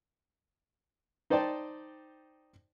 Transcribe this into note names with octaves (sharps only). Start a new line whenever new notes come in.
D#4 C5 D5 G5 A5